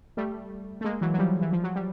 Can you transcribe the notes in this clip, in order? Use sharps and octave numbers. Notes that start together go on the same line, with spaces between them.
G3 A3
A3
G#3 A#3
E3 F#3
F#3
F3 G3
E3
F3
F#3
G3